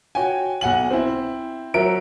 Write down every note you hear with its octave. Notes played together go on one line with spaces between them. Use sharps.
F#4 C#5 G5 G#5
B1 F#5 G#5 F#7
C4 E4
F#3 A#4 E5 D7